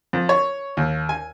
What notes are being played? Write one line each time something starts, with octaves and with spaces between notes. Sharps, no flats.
F2
C#5
D#2
G#5